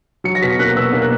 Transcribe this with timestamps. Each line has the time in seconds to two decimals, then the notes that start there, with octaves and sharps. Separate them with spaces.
0.24 F#3 C#7
0.35 A#6
0.42 B2 B6
0.59 A#3 F#6
0.76 B2 E6
0.93 A#3
1.02 F#6